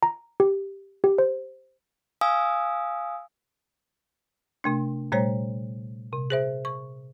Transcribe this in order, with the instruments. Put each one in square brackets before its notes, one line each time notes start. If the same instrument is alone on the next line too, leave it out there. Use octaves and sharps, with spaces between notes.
[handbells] A#5
G4
G4
C5
[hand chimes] F5 G#5 D#6 E6
[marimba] C3 A3 D4
A#2 G3 A3 C5 C#5 A#5
C3
G#4 C5 E5
C#6